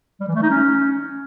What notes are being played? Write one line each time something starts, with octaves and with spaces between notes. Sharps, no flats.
G3
E3
A3
D#4
C#4